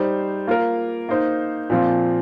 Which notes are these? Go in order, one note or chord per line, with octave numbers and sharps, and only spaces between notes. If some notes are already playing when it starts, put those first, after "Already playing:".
Already playing: G3 D#4 C5
A#3 F4 A#4
A#3 D#4 C5
A#2 F3 C4 F4